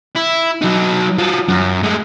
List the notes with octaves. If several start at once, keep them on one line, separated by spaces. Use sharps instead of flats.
E4
F#3 D#4
F#3 F4
F#2
G#3 A3